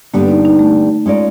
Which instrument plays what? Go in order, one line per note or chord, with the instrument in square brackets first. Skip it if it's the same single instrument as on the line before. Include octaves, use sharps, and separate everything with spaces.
[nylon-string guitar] G2 D3 G3 B3 D4 [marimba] A#3
[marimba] D#4
D#4
A3
[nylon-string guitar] G#3 C#4 F4 A#4 D5